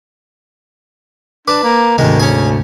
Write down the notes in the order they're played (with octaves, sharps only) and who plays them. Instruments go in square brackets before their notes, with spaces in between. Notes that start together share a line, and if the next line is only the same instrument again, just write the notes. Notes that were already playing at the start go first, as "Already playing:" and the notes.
[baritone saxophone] D4 [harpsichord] B4 A5 [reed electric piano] D6
[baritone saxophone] A#3
[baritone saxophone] D2 [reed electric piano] G#2 C3 [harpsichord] D#3 G#3
[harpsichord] C#4 G#4